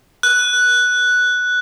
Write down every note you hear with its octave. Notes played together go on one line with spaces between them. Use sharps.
F#6